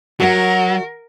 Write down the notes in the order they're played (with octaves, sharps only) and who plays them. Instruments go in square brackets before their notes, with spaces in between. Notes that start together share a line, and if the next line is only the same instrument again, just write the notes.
[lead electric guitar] F#3 [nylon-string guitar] F#4 E5 F#5 [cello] A#4